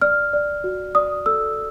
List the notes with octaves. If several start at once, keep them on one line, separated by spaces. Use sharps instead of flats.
D5 F6
D5
F#4
D5 D#6
A4 E6